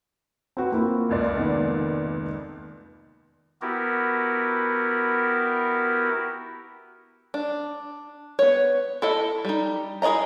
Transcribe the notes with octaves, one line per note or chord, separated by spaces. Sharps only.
C4 F#4 B4
A#3 E4 F4
F1 C#2 D5
D#3 A#3 B3
B3 E4 F#4 G4 A#4
D4
B3 C#5
E4 A4 D#5
G3 D#4
E4 G#4 D5 D#5 A#5